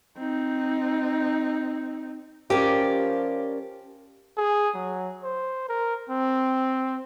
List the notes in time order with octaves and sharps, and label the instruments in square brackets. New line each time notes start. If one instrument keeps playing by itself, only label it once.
[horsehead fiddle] C4 D#4
[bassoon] F3 [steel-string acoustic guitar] C#4 A#4 D5 [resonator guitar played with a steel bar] G4
[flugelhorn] G#4
F#3
C5
A#4
C4